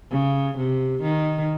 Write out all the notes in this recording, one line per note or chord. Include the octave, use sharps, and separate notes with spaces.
C#3
C3
D#3